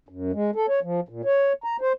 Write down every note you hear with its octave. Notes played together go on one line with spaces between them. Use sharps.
F#2
G#3
A4
C#5
F3
A#2
C#5
A#5
C5